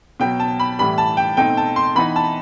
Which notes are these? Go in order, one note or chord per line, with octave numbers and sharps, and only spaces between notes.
B2 F#3 B3 G5
A5
B5
A2 E3 G3 B5
A5
G5
B2 A3 C4 D#4 G5
A5
C6
E3 B3 D#4 B5
A5